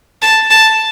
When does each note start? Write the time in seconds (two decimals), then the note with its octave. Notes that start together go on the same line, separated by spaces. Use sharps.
0.22 A5
0.50 A5